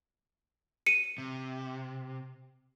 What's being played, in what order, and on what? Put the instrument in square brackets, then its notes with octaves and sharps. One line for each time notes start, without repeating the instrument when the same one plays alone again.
[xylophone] C#7 D#7
[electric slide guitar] C3